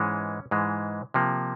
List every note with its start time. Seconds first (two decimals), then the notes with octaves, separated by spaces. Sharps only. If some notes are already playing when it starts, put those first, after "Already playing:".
Already playing: G#2 E3 G#3 C#4
0.51 G#2 E3 G#3
1.14 C3 F3 A#3